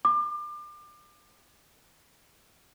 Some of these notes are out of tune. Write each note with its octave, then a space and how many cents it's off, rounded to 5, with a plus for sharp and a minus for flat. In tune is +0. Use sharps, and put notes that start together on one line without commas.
D6 +30